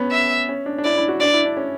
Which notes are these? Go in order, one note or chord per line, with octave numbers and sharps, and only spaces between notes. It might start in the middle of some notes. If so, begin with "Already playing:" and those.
Already playing: B3 C#4
E5
C#4
D4
D4
E4 D5
E4
F#4
D4 D5
E4
D4
C#4